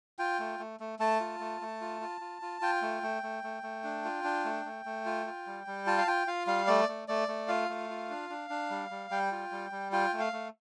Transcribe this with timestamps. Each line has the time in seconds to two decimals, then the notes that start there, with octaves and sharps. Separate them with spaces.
0.19 F4 G5
0.39 A3
0.59 A3
0.80 A3
0.99 A3 A5
1.20 F4
1.40 A3
1.61 A3
1.81 F4
2.01 F4
2.21 F4
2.42 F4
2.61 F4 G5
2.82 A3
3.03 A3
3.23 A3
3.44 A3
3.63 A3
3.84 D4
4.05 F4
4.24 D4
4.45 A3
4.65 A3
4.85 A3
5.05 F4
5.26 F4
5.47 G3
5.67 G3
5.86 F4 A5
5.98 F5
6.07 F4 G5
6.27 F4 F5
6.47 G3 F5
6.67 A3 D5
6.89 A3
7.08 A3 D5
7.28 A3
7.48 F4 F5
7.69 A3
7.90 F4
8.10 D4
8.30 D4
8.50 D4
8.70 G3
8.91 G3
9.11 G3 G5
9.32 F4
9.52 G3
9.72 G3
9.92 F4 G5
10.13 A3
10.20 F5
10.33 A3